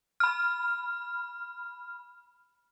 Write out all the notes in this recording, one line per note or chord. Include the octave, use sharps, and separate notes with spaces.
B5 F6